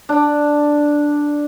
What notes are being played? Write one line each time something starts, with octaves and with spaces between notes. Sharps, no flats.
D4